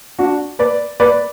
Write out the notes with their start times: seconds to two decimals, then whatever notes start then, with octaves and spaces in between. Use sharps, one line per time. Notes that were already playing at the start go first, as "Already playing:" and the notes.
0.18 D4 F#4
0.59 B4 D5
1.00 B4 D5